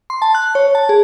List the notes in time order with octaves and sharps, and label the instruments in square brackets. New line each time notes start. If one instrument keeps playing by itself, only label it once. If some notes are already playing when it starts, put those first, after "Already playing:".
[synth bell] C6
A5
F#6
C#5
A5
G#4